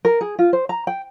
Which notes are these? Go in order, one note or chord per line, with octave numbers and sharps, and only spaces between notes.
A#4
G#4
F4
C5
A#5
G5